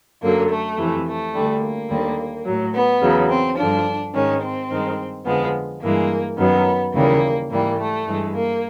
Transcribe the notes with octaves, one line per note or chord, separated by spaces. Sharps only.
F#2 D3 F#3 A#3
A3
F2 C3 E3
A3
D2 D3 G3
A#3
D#2 D3 G3
A2 F#3
B3
E2 C#3 F#3
C4
G2 D3 F3 D4
G#2 D#3 G#3 C#4
C4
G2 D#3 G#3
F2 D3 F3 G#3 B3
G2 E3 G#3 A#3
F#2 D#3 F#3 B3
D#2 C#3 E3 G3 A#3
G#2 E3 G3 A#3
A3
G2 E3 G#3
A#3